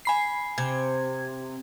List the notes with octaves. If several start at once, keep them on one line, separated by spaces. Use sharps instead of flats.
G#5 B5 C7
C3 G#6